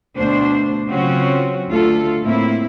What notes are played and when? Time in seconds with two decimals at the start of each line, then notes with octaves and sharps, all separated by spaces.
0.16 D2 B2 D4 C5
0.89 C#3 F#3 C4 C#4 F4 F#4
1.69 D2 A3 F4 A4
2.22 A2 A#3 C4 E4